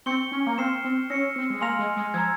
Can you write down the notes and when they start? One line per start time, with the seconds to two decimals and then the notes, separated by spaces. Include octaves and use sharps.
0.06 C4 C#6 G6 C#7 G7
0.32 C#4
0.46 A#3
0.58 C4 F6 C7 E7
0.84 C4
1.10 C#4 E6 A#6 C#7
1.36 C4
1.50 G#3
1.61 A#3 G#5 C6 F6 A#6 F7
1.79 G#3
1.96 G#3
2.14 F3 A#5 E6 G#6